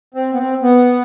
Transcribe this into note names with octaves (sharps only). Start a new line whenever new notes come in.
C4
B3
C4
B3